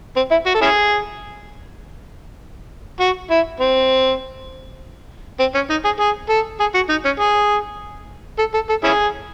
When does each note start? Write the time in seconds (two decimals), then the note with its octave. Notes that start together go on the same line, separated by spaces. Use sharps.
0.16 C4
0.31 E4
0.46 F#4
0.55 A4
0.61 C#4 E4 G#4
3.00 F#4
3.31 E4
3.60 C4
5.40 C4
5.54 C#4
5.70 D#4
5.85 G#4
6.00 G#4
6.29 A4
6.60 G#4
6.74 F#4
6.89 D#4
7.05 C#4
7.20 G#4
8.39 A4
8.54 A4
8.69 A4
8.84 C#4 E4 G#4